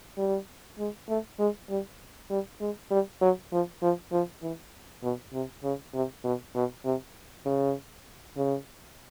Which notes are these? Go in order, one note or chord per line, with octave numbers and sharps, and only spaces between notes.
G3
G#3
A3
G#3
G3
G3
G#3
G3
F#3
F3
F3
F3
E3
B2
C3
C#3
C3
B2
B2
C3
C#3
C#3